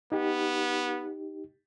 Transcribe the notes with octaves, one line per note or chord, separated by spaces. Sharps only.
B3 D#4 G4